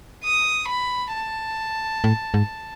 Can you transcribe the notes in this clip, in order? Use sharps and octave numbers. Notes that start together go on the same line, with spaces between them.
D#6
B5
A5
A2
G#2